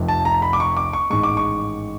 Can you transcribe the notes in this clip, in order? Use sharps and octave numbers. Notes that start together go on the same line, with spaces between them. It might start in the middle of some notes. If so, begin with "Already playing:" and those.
Already playing: F1 F2 C3 F3
A5
A#5
B5
D6
C#6
D6
C#6
A1 G#2 D#3 G#3 C#6
D6
C#6